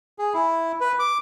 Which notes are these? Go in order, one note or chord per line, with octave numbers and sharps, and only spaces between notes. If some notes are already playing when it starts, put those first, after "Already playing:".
G#4
E4
B4
D6